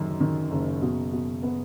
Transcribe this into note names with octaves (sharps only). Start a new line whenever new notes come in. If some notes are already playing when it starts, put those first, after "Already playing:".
Already playing: F#1 F#2 D#3
D#3
F#1
B2
B2
B3